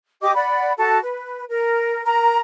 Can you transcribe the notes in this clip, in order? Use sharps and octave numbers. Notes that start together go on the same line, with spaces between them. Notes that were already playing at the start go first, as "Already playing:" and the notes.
G4 D#5 D6
D5 F#5 B5
F#4 A4 A5
B4
A#4
A#4 A#5